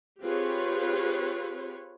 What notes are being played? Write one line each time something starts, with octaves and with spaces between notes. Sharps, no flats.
C4 F4 G4 G#4 B4 C#5